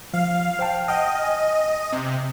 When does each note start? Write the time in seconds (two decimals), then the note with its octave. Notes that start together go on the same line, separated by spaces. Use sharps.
0.13 F3 F5
0.59 C5 G5 A5
0.88 D#5 F#5 G5 F6
1.23 G#5
1.92 C3